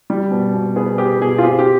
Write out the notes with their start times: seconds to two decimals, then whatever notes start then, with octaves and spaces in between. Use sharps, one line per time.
0.10 G3
0.31 B2
0.54 B2
0.76 B3 G#4
0.98 B3 G4
1.22 B2 G#4
1.38 F4
1.43 C4 G4
1.59 G4